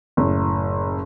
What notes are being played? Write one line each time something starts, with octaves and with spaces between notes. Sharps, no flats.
F#1 A2